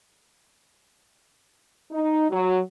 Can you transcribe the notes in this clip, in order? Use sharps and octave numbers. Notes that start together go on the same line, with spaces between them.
D#4
F#3